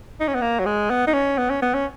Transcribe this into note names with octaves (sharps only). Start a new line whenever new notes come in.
D#4
C#4
B3
A#3
F#3
G#3
B3
D#4
C#4
B3
C#4
B3
C#4